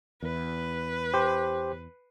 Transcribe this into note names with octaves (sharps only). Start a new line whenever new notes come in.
E2 B4
G4 C5